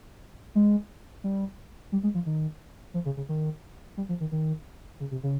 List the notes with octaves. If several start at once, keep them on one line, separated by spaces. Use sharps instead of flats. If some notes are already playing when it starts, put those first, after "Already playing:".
G#3
G3
G3
G#3
F3
D#3
F3
C#3
C#3
D#3
G3
F3
D#3
D#3
C#3
C3
C#3